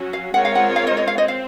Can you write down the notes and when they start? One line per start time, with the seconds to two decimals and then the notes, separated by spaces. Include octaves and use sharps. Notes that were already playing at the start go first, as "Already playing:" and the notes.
Already playing: F#3 C#4 F#4
0.13 F5
0.34 G#3 C4 F4 A#4 C#5 F#5
0.45 F5
0.55 F#5
0.76 F5
0.87 D#5
0.97 D#5
1.07 F5
1.18 C4 D#5
1.28 F5